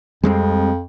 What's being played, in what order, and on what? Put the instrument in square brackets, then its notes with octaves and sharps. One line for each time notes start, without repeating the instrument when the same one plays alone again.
[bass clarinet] F2 [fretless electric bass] G3 G#3 C4